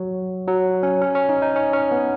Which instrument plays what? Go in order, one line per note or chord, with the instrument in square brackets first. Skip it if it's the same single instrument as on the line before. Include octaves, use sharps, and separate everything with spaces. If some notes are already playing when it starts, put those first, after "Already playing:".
Already playing: [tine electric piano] F#3
F#3
C#4
C#4
C#4
D#4
D#4
C#4
C#4
B3